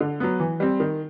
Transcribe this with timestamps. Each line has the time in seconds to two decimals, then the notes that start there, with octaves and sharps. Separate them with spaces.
0.01 D3
0.20 F#3 B3
0.40 E3
0.60 G3 C4
0.80 D#3